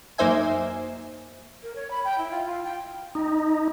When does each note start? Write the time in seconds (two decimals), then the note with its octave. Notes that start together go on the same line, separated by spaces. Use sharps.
0.18 F#2 A#3 D#4 C5 E5 G#5
1.63 A#4
1.76 C#5
1.91 B5
2.05 G5
2.18 E4
2.31 F4
2.46 F4
2.64 G5
3.15 D#4